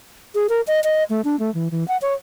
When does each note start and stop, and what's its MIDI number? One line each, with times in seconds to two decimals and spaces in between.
0.35 0.47 68
0.49 0.61 70
0.67 0.80 75
0.84 1.03 75
1.10 1.21 57
1.24 1.38 62
1.39 1.53 57
1.54 1.68 52
1.71 1.86 52
1.88 1.97 78
2.02 2.14 73